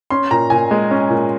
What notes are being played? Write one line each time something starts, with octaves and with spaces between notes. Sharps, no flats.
C#4 C6
A#2 A#5
A#2 G#5
G#3
C#4
A#2